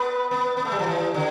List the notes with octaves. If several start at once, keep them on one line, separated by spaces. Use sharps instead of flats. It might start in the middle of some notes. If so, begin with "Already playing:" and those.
Already playing: B3 B4
B3
B3
A3
G3
F3
E3
D3